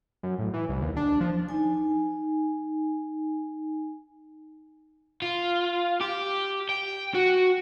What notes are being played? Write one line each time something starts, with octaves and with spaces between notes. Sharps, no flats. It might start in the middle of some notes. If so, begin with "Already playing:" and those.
F#2
A1
E3
C2
D#2
D4
F3
D#4 G#5
F4
G4
G5
F#4